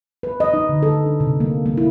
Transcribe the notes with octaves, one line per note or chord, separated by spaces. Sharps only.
B4
D#5
D#4
D3
A4
D4
C3
A#3
A#3
E4